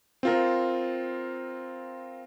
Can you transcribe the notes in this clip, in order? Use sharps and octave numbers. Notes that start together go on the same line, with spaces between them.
C4 F4 A#4